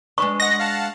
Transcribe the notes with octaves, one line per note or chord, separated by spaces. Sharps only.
G#3 D4 B4 C#6
D#5 F#5 A#6
F5 F#5 A5